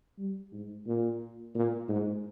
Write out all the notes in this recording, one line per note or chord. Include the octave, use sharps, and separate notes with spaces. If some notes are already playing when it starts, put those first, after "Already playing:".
G3
G#2
A#2
A#2
G#2